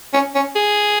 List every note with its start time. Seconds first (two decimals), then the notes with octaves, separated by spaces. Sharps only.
0.13 C#4
0.35 C#4
0.55 G#4